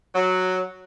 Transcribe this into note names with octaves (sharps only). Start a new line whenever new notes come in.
F#3